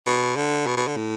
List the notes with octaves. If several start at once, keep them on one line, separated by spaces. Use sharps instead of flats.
B2
D3
B2
B2
D3
A2